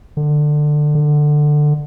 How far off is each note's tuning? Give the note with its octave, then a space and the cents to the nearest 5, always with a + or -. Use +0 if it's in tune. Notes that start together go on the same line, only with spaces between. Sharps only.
D3 +20
D3 +15